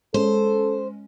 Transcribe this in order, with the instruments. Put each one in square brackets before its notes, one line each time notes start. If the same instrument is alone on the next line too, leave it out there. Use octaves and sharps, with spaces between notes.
[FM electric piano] G#3 C#4 [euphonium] A4 [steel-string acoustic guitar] C5